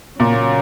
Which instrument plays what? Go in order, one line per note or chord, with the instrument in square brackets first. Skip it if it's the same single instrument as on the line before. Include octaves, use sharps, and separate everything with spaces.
[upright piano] A#2 [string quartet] C#3 F#3 A#3